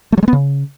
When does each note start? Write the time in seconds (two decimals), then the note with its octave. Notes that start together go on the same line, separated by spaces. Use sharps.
0.12 A3
0.18 F#3
0.23 G#3
0.28 B3
0.33 C#3